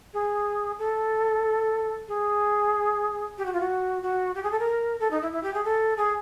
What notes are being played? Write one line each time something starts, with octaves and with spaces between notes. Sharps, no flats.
G#4
A4
G#4
G4
F#4
F4
F#4
F#4
G4
G#4
A4
A#4
A4
D#4
E4
E4
G4
G#4
A4
G#4